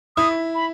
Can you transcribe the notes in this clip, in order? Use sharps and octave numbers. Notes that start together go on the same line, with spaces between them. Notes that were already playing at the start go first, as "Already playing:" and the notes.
E4 D#6
B5